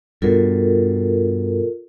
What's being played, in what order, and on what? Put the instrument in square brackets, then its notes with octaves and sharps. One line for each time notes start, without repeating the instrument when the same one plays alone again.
[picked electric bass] G2 B2 [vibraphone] F4 A4 A#4